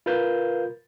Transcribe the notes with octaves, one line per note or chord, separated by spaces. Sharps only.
F4 A#4 B4 F5 G6